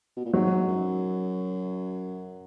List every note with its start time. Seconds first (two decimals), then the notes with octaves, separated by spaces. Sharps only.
0.17 B2
0.25 A#2
0.33 G#2 F#3
0.68 F#2